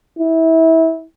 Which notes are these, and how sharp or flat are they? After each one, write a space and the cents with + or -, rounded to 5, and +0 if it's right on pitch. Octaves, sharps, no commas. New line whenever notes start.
E4 -25